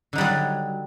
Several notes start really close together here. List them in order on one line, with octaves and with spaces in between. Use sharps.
D3 D#4 G3 F#3